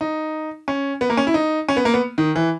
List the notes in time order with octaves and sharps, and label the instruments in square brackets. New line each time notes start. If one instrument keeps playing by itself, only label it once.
[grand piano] D#4
C#4
B3
A#3
C#4
E4
D#4
C#4
B3
A#3
B3
D#3
E3